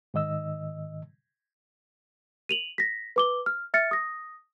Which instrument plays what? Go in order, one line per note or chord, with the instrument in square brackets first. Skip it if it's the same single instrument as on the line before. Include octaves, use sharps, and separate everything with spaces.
[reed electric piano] G#2 D#3 D#5 E6
[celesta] D#7 F7 F#7
A#6 B6
B4 D6 G7
F6
E5 F6 A6 C#7
D#6 A#6